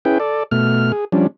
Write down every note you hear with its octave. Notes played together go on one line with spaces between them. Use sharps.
C#4 E4 G#4 B4 G5
A4 D5
B2 A3 F6
G#4
F3 G3 C#4 D4